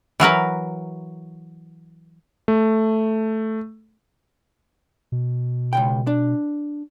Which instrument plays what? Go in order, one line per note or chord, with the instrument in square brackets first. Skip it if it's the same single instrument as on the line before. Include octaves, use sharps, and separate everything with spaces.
[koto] E3 F#3 A#4 B4
[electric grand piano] A3
[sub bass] B2
[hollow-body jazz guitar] C#2 G#2 G5
D4